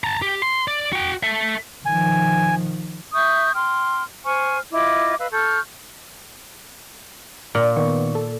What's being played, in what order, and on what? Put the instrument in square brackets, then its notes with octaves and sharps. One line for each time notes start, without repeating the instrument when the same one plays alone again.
[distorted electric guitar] A5 A#5
G4
C6
D5
F#4 G5
A4 E5
[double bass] D#3 F3 [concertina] G#5
[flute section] E5 C#6 D#6 G6
G5 C6 F6
C5 G#5 C#6 F6
E4 F4 D#5 D6
B4 D#5 F5 E6
A4 C#6 F6 G6
[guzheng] A#2 [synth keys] A#4
[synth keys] D#3 B3 C#6
A4